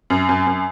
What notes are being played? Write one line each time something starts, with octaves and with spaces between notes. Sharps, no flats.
F#2
F#2
F#2